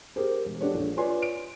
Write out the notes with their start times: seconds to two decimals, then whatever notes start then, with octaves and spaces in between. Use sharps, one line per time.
0.16 G4 G#4 A#4 C5
0.45 E1
0.61 D4 F#4 G4 A4 C#5
0.74 A#1
0.97 F4 B4 C#5 D5 G#5 C6
1.22 D7